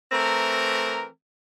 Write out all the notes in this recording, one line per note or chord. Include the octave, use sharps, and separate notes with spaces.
E3 A3 C4 A#4 A#5